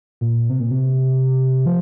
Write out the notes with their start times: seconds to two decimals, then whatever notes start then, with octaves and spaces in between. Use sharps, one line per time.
0.21 A#2
0.50 C3
0.60 A#2
0.71 C3
1.66 F3